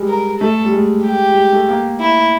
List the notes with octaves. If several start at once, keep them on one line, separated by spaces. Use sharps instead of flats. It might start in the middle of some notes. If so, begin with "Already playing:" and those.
Already playing: G3 G#3
A#4
A3 A4
G3
G#3
G4
G3
G#3
A3
A#3
E4